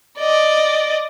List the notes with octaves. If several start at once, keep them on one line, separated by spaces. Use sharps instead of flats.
D5 D#5